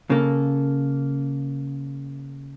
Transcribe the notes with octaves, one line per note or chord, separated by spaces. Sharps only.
C#3 A#3 A4